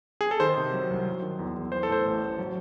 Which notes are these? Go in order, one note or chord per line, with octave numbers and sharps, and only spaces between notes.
G#4
A4
D#3 C5
C3
F#3
C2
F#3
D#3
E2
E2
E3 C5
A4
A2 C5
A1
A1
F#3